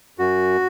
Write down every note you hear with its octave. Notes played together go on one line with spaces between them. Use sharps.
F#2 F#4